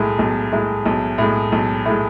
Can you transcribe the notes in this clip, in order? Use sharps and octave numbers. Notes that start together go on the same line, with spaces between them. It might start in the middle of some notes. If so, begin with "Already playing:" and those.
Already playing: B1 A2 G#3
B1
A2 G#3
B1
A2 G#3
B1
A2 G#3